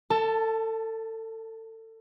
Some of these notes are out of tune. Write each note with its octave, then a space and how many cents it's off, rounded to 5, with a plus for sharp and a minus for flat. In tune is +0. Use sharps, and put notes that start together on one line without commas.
A4 +30 A5 +0